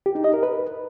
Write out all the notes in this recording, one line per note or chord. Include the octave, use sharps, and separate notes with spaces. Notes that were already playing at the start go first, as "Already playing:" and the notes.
G4
D#4
D#5
A#4
B4